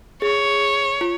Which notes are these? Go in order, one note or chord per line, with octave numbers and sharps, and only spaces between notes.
G#4 C#5
F4